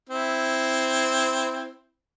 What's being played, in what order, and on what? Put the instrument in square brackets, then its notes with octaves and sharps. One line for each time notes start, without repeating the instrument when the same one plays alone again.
[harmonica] C4 E4